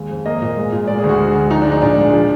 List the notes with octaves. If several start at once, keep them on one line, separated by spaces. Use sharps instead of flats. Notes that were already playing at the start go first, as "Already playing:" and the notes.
Already playing: D#2 G#3
F2
A#3 D#5
A#2
G#3
A#2
G#3 D5
G#4
D2
F#4
G#3
D2
F3 D#4
D4
G#3
D#4
A#2 D4
G#3
F3